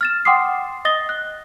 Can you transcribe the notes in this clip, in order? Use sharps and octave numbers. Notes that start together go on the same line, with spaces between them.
F6 A6 E7
F#5 G5 C6 D6 D#6 C7
D#5 D#6 A6 A#6 G7
F#6